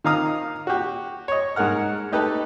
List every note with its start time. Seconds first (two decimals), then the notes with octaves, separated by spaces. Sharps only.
0.04 D#3 D#4 F5 A#5 D#6 F6
0.67 F#4 G4
1.28 C#5 D#5
1.56 G#2 D#4 A#4 F#5 F6
2.12 A3 D#4 G4 A4 B4